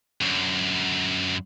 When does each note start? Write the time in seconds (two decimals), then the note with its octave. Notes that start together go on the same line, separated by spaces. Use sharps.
0.21 F#2 D3